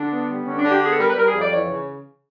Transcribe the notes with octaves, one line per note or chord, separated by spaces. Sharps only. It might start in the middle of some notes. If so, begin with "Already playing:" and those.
Already playing: D3 D4
B3
G3
D3 C#4
D4
D3
G4
B3 G#4
A4
G3 A#4
B4
G3 A#4
G#4
F2
D5
E3 C#5
C#3